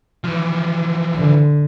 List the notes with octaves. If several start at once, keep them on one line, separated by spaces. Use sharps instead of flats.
E3 F3
D3